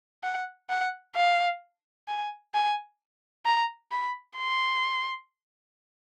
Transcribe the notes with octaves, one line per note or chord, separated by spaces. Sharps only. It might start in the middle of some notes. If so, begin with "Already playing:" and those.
F#5
F#5
F5
G#5
G#5
A#5
B5
C6